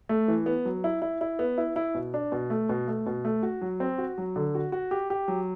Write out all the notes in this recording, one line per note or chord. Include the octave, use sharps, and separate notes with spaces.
A3
E3
B3
F#3
E4
E4
E4
B3
E4
E4
B2
D4
B2
A3
B2
A3
B2
A3
F#4
F#3
C4
F#4
F#3
D3
F#4
F#4
G4
G4
F#3